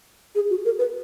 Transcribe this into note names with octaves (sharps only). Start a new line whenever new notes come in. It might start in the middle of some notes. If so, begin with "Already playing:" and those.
G#4
F#4
A#4
B4